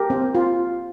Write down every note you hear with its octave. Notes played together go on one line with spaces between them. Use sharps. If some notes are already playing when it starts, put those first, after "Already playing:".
Already playing: G4 A#4
C4
F4